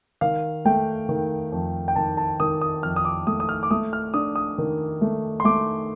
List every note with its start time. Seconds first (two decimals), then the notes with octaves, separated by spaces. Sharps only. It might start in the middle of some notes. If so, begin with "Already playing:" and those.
0.21 D#3 F5
0.65 A3 G5
1.09 D#3
1.52 F2
1.88 G5
1.96 D#3 A5
2.17 A5
2.40 D#3 D#6
2.61 D#6
2.83 F2 F6
2.96 D#6
3.05 D6
3.27 A3 D#6
3.40 D#6
3.49 F6
3.63 D6
3.71 A3 D#6
3.93 F6
4.14 D4 D#6
4.36 D#6
4.58 D#3
5.01 A3
5.40 C6
5.44 A3 D6